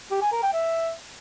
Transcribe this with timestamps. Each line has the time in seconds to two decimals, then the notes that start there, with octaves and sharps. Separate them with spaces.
0.11 G4
0.22 G#5
0.32 A#4
0.43 G5
0.53 E5